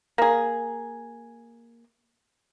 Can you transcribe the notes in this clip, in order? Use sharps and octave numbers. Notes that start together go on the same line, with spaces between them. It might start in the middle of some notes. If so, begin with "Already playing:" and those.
A#3 G#4